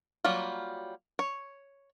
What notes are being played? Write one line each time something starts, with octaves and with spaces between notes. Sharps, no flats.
F#3 G3 A#3 F4
C#5